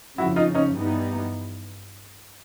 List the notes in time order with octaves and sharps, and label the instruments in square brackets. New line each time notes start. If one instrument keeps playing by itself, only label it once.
[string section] F2 C#3 F3 [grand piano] E4 F#4
[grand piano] D#4 F4
C#4 D#4
[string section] G2 E3 G3 B3 D#4